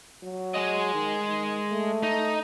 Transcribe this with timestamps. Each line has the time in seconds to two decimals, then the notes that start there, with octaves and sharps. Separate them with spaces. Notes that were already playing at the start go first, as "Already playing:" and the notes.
0.23 F#3
0.55 G#3 D#5
0.94 D#3
1.29 D#3
1.71 A3
2.03 D#4